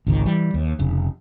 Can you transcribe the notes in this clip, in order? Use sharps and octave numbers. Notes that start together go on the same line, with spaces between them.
G#1 C#2 D#3
E3 G3
D#2
F1 C#3